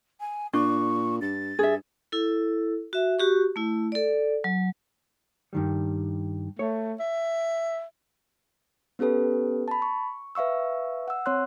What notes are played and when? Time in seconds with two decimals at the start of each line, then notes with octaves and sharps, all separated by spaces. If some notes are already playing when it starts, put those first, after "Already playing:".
0.20 G#5
0.53 A#2 D4 C#6
1.21 G2 A6
1.59 G2 G#4 E5
2.12 E4 A4
2.93 F#4 E5
3.19 F#4 G4 C#6
3.56 A3 E4
3.92 A4 D5
4.44 F#3
5.53 G2 D#3 G3
6.59 A3 C#5
7.00 E5
8.99 B3 C#4 G4 A4 B4
9.68 A5 B5
9.82 C#6
10.35 B4 E5 F5 C#6 E6
11.08 F#5 E6
11.26 C4 C#5 C6 F#6